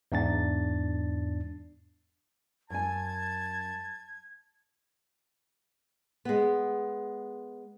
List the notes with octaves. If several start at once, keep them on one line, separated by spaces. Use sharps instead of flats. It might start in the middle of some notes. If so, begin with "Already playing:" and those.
E2 G#2 D4 A6
F#2 G#5 A5 G#6
G#3 B3